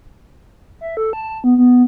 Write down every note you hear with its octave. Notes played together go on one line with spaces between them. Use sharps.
E5
A4
A5
B3
B3